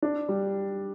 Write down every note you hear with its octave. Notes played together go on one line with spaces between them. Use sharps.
D4
G3